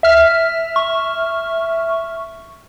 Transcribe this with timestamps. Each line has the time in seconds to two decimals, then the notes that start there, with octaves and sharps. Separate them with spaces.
0.03 E5 F6
0.76 C#6